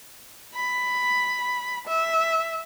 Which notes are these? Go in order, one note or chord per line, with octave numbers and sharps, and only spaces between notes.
B5
E5